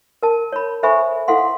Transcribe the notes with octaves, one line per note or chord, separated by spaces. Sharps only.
A#4 A5
C#5 B5
A4 C5 E5 G#5 B5 C#6
E4 A4 F5 F#5 C6